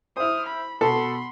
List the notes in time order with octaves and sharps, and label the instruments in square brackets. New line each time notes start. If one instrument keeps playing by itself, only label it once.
[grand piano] E4 C5 [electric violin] D#6 F6
[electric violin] B5
[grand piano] B2 [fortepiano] A4 [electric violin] B5 C6